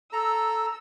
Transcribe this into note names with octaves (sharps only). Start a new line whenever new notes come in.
A4 A#5 E6